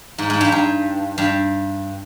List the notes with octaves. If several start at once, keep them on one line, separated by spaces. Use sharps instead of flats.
G#2
G#2
G2
G2
G2